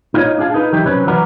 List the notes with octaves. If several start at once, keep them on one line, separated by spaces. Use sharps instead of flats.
D#4 F4 G4 B4 C#5 D#5
D4 F4 G#4 F5 A5
D#4 A#4 B4
E3 F#3 D#4 G4
C3 F#3 C4 C#4 B4
E3 F#3 F#4 A#4 B4 D5